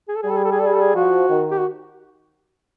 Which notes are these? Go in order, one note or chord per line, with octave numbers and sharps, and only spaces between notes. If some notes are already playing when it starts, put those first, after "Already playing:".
G#4
A4
G#4
G3 A4
G#4
A4
G#4
A4
G#4
A4
G#4
F3 F#4
D#3
G4
F#4